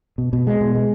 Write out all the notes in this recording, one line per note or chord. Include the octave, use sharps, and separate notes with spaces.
B2
B2
G#3
B2
G#3